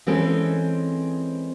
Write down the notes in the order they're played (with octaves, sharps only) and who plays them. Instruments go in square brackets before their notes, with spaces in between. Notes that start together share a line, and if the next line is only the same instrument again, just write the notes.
[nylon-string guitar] E3 G#3 C4 C#4 A4 C5